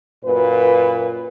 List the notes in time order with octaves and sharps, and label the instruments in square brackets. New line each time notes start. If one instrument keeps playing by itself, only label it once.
[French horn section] F#2 A#2 F#4 B4